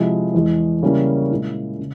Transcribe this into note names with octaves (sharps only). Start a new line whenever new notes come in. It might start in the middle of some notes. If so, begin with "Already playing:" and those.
Already playing: C3 F3 G#3 E4
E2 E3 G#3
C#3 G3 A#3 C#4 E4
A#2 G#3 E4
C#3